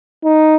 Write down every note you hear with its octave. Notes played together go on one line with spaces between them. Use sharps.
D#4